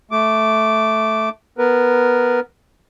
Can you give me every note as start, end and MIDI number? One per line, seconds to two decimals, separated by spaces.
0.11 1.29 57
0.11 1.29 86
1.58 2.40 59
1.58 2.40 70
1.58 2.40 71